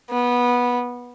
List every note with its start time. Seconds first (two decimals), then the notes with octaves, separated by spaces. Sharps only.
0.11 B3